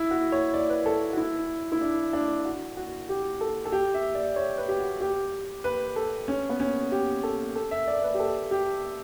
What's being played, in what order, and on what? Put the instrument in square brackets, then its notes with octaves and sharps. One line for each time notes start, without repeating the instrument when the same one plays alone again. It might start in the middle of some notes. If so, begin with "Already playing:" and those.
Already playing: [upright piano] E4
F#4
C#5
D5
B4
A4
F#4
E4
E4
D4
D4
F#4
F#4
G4
A4
A4
G4
E5
D5
C#5
B4
G4
F#4
G4
B4
A4
C#4
B3
C#4
G4
A4
A4
E5
D5
B4
G4
A4
G4